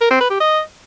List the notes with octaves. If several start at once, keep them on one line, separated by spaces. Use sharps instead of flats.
A#4
C4
B4
G4
D#5